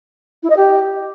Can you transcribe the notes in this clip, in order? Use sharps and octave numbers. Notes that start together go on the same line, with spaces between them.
E4
D#5
G4